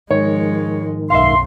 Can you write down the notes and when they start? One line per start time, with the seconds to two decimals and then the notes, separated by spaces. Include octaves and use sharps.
0.11 G#2 D#3 F3 G#3 C#5
1.10 B1 F#2 E5 F5 C6